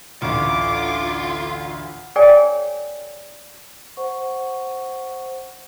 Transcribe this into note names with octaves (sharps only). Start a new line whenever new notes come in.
A1 D2 F4 D6
G#4 A#4 C#5 D5 G5 G#5
C5 F#5 C#6